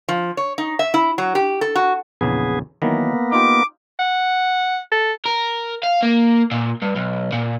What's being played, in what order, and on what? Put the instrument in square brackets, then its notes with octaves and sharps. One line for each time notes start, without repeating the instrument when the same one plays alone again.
[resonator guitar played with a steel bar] F3
C#5
D#4
E5
E4
F#3
G4
A4
F#4
[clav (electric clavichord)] A#1 E2 C#3 [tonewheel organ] B3 G#4
[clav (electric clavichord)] D#3 E3 F#3 [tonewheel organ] A#3 B3
[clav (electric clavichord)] D#4 F4 G4 [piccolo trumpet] D6
[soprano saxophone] F#5
A4
[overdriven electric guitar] A#4
F5
A#3
A#2
G2
B1
A#2